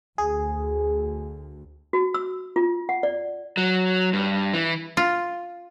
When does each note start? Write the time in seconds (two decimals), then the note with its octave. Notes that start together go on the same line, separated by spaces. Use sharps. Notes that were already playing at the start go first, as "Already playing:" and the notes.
0.18 D2 G#4
1.93 F#4
2.14 E6
2.56 F4
2.89 F#5
3.03 D5
3.57 F#3
4.13 G2
4.54 E3
4.97 F4